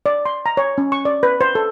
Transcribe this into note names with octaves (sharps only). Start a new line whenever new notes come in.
D5
C6
A#5
C#5
C#4
C#6
D5
B4
C5
A4